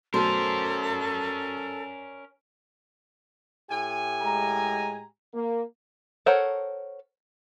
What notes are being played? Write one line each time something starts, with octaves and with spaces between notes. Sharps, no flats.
B2 F#3 A3 C#4 A4 A#4 C5 D5
A2 G4 G#5
G#3 A#5
A#3
A4 A#4 C5 C#5 F#5